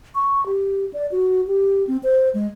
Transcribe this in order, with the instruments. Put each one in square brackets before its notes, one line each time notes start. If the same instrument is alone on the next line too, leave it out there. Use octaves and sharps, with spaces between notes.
[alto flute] C#6
G4
D5
F#4
G4
C4
C5
G#3